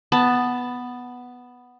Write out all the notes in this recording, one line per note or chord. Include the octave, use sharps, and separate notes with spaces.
B3 A5